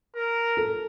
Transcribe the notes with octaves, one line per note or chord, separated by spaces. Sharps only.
A#4
A4